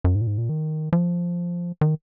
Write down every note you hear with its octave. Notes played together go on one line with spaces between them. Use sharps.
F#2
G#2
A#2
G#2
A#2
D#3
F3
D#3